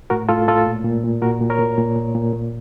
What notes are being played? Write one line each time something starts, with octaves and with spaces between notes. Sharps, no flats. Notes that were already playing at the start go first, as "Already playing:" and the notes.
A2 F#4 A#4
A2 F4 A4
A2 F4 A4
A#2
A#2
A#2
A#2 F#4 A#4
A#2
A#4 C#5
A#2
A#2
A#2
A#2
A#2